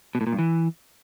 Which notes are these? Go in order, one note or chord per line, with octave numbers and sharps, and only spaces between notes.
B2
A2
A#2
G2
E3